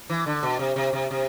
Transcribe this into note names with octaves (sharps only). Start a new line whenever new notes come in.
E3
D3
B2
C3
C3
C3
C3